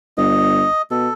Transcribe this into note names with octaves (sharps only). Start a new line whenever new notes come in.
G1 D#5
B2 A4